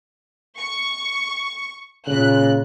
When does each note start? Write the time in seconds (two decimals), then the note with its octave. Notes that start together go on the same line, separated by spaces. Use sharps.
0.56 C#6
2.07 A#2 C#3 F#6